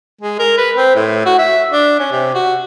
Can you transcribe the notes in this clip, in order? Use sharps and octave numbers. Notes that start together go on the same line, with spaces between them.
G#3
A#4
B4
C4
A2
F#4
E5
D4
C#4
C3
F#4